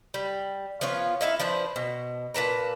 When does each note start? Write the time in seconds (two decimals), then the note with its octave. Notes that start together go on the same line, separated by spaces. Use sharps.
0.14 G3
0.81 F3 B3 F4 C#5
1.21 D#4 E4 E5 F5
1.40 F3 D4 B4 C5
1.76 B2
2.34 A#2 B4 A5 A#5